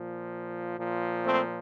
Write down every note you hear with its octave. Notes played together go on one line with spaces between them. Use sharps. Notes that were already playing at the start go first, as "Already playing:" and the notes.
Already playing: A#2 F3
A#2 F3
A3 C4